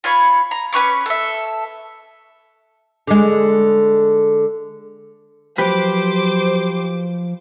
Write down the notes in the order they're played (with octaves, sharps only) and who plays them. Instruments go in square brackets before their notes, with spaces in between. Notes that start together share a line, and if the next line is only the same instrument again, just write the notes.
[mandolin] F4 C#5 B5 C#6
A#5
C#4 B4 C#6 D6
A4 E5
[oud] D3 G#3
[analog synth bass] F3 [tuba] F#3 [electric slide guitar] G4 B4 [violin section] C5 D6